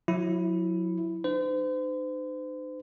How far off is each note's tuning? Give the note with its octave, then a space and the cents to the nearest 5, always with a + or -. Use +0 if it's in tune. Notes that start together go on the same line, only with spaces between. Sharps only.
F#3 -30 E4 +0
D#4 -45 C5 -40